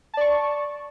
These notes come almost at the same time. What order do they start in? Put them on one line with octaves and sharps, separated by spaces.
A5 D5 C#6